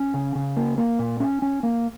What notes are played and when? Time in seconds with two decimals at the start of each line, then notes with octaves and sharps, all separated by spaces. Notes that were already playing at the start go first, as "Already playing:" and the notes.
Already playing: C#4
0.14 C#3
0.35 C#3
0.57 A#3
0.78 A#3
0.99 A#2
1.20 C#4
1.42 C#4
1.63 A#3